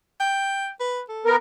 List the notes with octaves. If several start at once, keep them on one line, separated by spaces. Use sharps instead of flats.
G5
B4
A4
B3 A#4